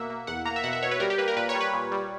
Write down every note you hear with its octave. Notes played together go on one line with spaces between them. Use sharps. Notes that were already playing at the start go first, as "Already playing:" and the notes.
Already playing: B2 A#3 E5 F#5
A#3
E2 F#5
A#3 A#5
E5
B2 F#5
E5
B2 C#5
B4
G3 A#4
G4
A#3 B4
A#4
A#2 B4
C#5
G3
B4
A#2
G3